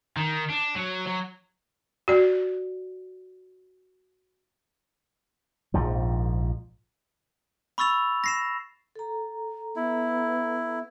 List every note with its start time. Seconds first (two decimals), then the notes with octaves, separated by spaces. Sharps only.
0.17 D#3
0.50 D4
0.76 F#3
1.07 F#3
2.08 F#4 D5
5.74 A#1 G#2 F3
7.78 B5 C#6 E6 A6 F7
8.24 A#6 C7 E7
8.95 A4 A#5
9.76 B3 E4